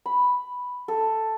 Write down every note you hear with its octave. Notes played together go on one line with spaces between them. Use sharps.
B5
A4